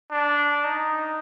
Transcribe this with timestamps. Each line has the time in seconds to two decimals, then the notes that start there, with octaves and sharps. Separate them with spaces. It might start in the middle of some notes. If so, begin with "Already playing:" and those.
0.11 D4
0.64 D#4